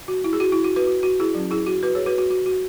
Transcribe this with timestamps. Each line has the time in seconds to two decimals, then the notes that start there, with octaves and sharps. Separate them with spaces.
0.08 F#4
0.24 E4
0.33 G#4
0.40 F#4
0.52 E4
0.64 F#4
0.76 F#4 B4
0.87 F#4
1.03 F#4
1.20 E4 G#4
1.35 F#3 C#4
1.51 E4 G#4
1.67 F#4
1.83 F#4 B4
1.95 G#4 C#5
2.06 F#4 B4
2.18 F#4
2.31 F#4
2.46 F#4